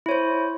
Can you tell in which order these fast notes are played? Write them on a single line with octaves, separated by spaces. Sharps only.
E4 C#5 C5